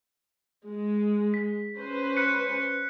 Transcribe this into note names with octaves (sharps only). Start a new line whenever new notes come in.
G#3
B6
C#4 B4 C5
F#6 B6 C#7